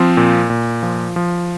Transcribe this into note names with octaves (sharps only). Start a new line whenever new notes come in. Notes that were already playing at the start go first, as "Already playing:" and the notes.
Already playing: F3 C4
A#2
A#2
F3
F3